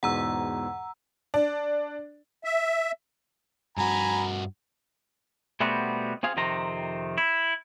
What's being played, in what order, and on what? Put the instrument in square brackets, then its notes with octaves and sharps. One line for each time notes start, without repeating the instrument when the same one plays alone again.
[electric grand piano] E2 G#2 B2 [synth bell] F#5 A#5 E6
[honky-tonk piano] D4
[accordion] E5
[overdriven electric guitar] G2 F#4 [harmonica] G#5 A#5 B5
[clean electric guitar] B2 G3 A3 B3 C4 F#4
C4 F4 G#4 F5
F2 C3 D#3 C4 A#5
E4